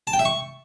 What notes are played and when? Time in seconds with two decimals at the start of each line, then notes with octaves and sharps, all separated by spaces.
0.07 A5
0.13 G5
0.19 E5
0.25 C#6